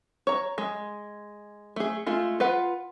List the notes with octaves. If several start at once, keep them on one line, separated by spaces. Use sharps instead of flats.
C#5 A#5
G#3
A3 G#4
G#3 A3 F4
F4 B4 F#5